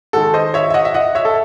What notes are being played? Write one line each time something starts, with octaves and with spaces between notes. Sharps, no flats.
D#3 G#3 F#4 A4
C5 D#5
C#5 E5
E5
D#5 F#5
E5
D#5 F#5
C#5 E5
A4